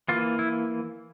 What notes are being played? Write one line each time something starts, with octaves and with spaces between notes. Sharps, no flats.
E3 A#3 F4
E4